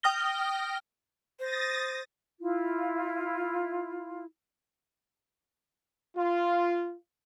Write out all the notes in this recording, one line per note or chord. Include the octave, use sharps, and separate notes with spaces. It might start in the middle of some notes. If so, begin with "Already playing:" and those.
G5 D#6 F6 A#6 G7
C5 D#6 A6 A#6
E4 F4
F4